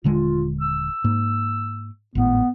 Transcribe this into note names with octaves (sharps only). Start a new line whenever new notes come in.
D#1 D3 G#3 F4
E6
G#2 A#3
G#1 A2 B3